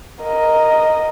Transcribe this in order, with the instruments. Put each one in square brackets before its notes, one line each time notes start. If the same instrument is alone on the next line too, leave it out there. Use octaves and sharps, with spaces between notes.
[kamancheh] A#4 D#5